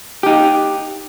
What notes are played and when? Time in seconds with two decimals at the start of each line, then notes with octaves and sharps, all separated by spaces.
0.23 D#4 G4